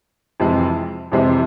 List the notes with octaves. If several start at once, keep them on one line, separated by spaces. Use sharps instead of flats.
F2 C3 E3 G#3
F2 C3 E3 G#3